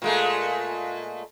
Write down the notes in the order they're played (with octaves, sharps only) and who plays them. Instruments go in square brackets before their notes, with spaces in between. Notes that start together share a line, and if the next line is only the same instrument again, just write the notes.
[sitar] A#2 G#3 A3